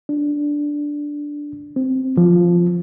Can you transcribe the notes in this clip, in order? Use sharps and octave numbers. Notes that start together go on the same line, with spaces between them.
D4
C4
F3